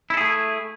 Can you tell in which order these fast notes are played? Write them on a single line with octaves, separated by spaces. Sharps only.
E4 A4 G#4 A3